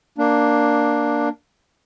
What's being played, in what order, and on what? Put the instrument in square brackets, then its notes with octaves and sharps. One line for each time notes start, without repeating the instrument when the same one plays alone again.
[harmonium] A#3 D4